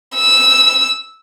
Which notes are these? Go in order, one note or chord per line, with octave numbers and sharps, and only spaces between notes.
E6